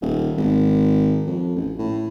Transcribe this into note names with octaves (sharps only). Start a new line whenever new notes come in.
D#1
G#1
F2
A1
A2